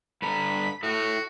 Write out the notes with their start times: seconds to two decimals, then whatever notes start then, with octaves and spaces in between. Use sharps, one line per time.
0.22 G2 A4 A#5 B5
0.83 E4 F#4 A4